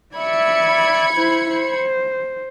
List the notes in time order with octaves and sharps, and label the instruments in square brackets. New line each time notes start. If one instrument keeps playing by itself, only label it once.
[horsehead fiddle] D5 E5 [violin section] B5 G#6 C#7
[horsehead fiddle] E4 C5
C5